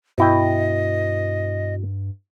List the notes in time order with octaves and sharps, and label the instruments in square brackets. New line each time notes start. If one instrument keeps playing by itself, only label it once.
[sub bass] G2 [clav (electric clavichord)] B2 E4 G5 [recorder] D#5